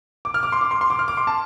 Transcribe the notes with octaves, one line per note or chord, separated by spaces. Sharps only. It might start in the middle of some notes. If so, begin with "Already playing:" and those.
D6
F6
D6
C6
D6
C6
C6
D6
F6
D6
C6
A5